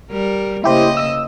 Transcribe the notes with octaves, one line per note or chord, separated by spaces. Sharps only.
G3 A#4
C#3 A#3 E4 G4 C5 D#5
E6